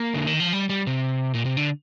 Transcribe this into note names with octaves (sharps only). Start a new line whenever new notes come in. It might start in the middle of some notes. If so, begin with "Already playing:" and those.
Already playing: A#3
D3
D#3
F3
G3
G3
C3
A#2
C3
D3